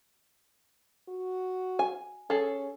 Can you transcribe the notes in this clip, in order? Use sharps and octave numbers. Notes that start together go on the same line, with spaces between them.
F#4
G#5
C#4 G#4 A4